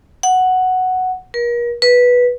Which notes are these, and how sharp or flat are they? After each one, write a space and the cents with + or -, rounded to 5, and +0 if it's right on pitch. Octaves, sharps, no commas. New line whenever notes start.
F#5 +0
A#4 +40
B4 -10